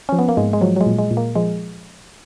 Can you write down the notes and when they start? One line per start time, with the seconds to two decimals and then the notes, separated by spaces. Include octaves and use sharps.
0.09 F3 C#4
0.19 B3
0.29 A#3
0.37 G#2 G#3
0.53 G#3
0.61 F3 F#3
0.76 F#3
0.81 G#3
0.86 A#2
0.99 G#3
1.11 A#2
1.17 A#3
1.35 F3 G#3